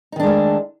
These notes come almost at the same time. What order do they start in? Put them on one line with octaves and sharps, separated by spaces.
D#4 D#3 D4 G#3 A3